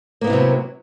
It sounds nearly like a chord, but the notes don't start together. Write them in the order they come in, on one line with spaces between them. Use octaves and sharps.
A#3 B3 E4 C3 F#3